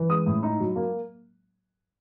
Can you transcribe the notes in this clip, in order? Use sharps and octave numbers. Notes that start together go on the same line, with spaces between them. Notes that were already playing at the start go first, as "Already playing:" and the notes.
Already playing: E3
G#3 D#6
A2
D#4
F#3
A#3